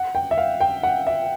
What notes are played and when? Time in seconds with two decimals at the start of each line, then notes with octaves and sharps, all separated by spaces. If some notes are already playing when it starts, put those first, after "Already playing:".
Already playing: F#5
0.15 G5
0.31 E5
0.38 F5
0.60 G5
0.83 F#5
1.07 E5